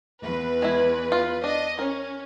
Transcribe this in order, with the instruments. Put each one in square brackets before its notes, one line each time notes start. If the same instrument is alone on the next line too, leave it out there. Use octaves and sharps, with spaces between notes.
[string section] E2 B4
[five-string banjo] G#3 E4
F4
[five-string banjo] D4 [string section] D#5
[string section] C#4 [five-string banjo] A#4